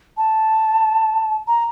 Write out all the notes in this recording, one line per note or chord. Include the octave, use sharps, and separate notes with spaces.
A5
A#5